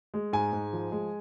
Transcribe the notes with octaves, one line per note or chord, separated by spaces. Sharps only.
G#3
G#2 G#5
G#2
F3
G#3